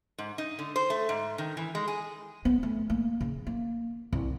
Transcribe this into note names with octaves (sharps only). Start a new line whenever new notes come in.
G#2
D#4
D3
C5
A3
G#2
D#3
E3
G#3
G#4
B3
A3
A#3
C#3
A#3
C2